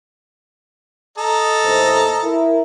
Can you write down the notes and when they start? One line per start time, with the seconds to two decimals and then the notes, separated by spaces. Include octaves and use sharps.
1.18 A4 D#5 A#5
1.65 D#2 A2 C5
2.23 E4 A#4